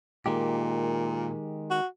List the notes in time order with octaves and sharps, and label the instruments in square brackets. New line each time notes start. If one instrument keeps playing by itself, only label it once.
[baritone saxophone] A#2 [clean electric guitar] D#3 G#3 G4
[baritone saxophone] F#4